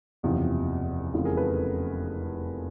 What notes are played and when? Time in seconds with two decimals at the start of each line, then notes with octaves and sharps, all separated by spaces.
0.23 F#1 E2 C3 F3
1.14 F1 E2 C#3 F3
1.25 G#4 A#4
1.37 A4 B4